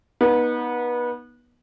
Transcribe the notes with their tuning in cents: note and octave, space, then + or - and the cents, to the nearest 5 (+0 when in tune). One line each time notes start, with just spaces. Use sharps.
B3 -25 D#4 +0